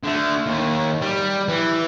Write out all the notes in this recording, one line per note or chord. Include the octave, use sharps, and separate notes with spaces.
D3 A3
D#2
G3
E3